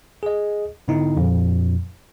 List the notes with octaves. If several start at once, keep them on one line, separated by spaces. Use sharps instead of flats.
G#4 D#5
G#2 D3 B3 D#4 E4
F2 A#2